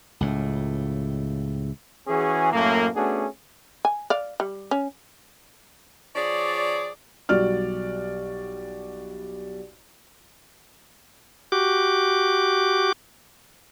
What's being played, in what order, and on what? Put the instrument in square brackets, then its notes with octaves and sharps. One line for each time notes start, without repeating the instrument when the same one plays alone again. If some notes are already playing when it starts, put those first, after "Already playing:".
[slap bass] C#2 A2
[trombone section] E3 C#4 F#4 G#4
F#2 A2 A3 A#3
A3 B3 C#4 D4 F#4 G#4
[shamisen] G#5
D5 F5
G3
C#4
[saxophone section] F3 G#4 C#5 D5
[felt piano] B1 G3 F#4 D5 F6
[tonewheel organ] F#4 G4 D6